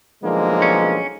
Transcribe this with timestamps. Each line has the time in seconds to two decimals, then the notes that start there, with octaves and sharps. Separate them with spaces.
0.24 B1 D3 F3 G#3 A#3
0.62 C#4